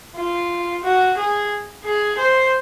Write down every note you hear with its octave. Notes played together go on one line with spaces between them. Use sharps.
F4
F#4
G#4
G#4
C5